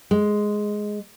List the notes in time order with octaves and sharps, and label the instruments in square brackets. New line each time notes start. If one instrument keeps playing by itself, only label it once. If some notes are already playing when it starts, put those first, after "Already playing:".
[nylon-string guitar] G#3